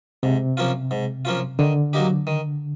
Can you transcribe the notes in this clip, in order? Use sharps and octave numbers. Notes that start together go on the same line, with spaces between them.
G#2 C3
F3 A#3 C#4 F4
G#2
F3 A#3 C#4 F4
D3 D#3
F#3 A#3 D#4 G4
D#3